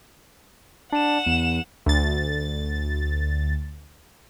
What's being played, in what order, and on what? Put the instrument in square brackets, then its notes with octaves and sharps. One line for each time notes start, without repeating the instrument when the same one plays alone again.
[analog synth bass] D4 [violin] F#5 E7
[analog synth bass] E2
[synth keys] D2 A6